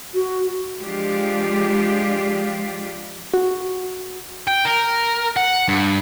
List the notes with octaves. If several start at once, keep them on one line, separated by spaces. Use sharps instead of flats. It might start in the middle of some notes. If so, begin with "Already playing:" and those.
F#4
F3 G#3 D4 F4 G4
F#4
G5
A#4
F#5
G2